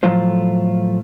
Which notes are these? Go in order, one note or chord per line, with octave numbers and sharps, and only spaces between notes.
A2 F3 F#3 A3 F4 C5